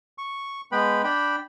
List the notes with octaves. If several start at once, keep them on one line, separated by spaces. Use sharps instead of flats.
C#6
G#3 B3 B4 G5 B5
D4 G5 B5